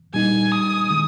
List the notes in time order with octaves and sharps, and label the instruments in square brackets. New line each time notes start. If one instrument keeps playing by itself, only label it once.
[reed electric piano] A#2 G3 A#3 D#4 [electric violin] G#5
[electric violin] D#6
[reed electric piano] D#3 G#3